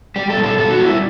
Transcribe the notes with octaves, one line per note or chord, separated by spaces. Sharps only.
G3 G4
A4
B2
A4
B2 A4
F#4
G3
E4